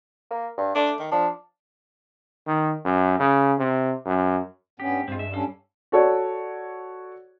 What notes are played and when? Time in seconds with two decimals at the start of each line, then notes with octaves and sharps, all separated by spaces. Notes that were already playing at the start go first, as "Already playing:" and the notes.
0.31 A#3
0.58 G2
0.75 A3 D4
0.99 D#3
1.12 F3 D4
2.47 D#3
2.85 F#2
3.19 C#3
3.58 C3
4.06 F#2
4.80 G2 B3 C#4 G4
5.08 G2 G#3 C4 F4
5.19 E5
5.33 G3 C#4 D4 A4 F5 E6
5.92 F#4 A4 C#5 D5